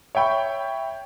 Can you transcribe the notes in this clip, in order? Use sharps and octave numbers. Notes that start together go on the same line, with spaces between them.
C#5 E5 G5 B5 C#6